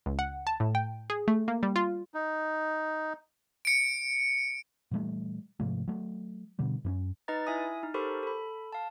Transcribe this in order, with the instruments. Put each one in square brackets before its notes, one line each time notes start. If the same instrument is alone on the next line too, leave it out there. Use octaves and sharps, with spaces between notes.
[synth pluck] C#2
F#5
A5
A2
G5
G#4
A3
A#3
G3
F4
[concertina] D#4
[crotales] C#7 D7
[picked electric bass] A#2 E3 G3 A3
G#2 C3 F3 A3
F#3 A3
B2 D3 G3
F#2 B3 C#4
[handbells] D#4 B4 D#5 A#5 A6
E4 E5 G#5 D#6
D#4
G4 A4 A#4 C5 B5 C#6
A4 B5
F5 A5